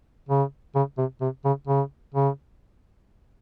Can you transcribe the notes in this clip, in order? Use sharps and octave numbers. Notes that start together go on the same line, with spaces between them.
C#3
C#3
C3
C3
C#3
C#3
C#3